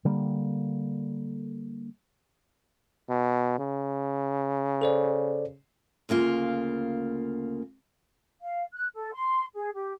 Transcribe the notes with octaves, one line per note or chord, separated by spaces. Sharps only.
D3 G3 A#3
B2
C#3
A4 C5 D5
D2 C#3 A#3 F4
F5
F#6
A4
C6
G#4
G4